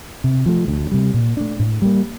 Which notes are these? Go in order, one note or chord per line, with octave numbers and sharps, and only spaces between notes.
C3
F3 A3
D2
C3 G3
A#2
A3 D4
A2
G3 A#3